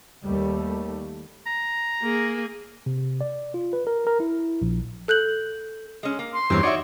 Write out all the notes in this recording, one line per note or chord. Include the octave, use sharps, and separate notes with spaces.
D#2 G3 A3
A#5
A#3 G#4
C3
D5
F4
B4
A#4
A#4
E4
A#1
A4 F#6 G6 F#7
G#3 C#4
A#3
C6
E2 G2 A#3 C4 C#5
D#4 F#4 C#5 D5 E5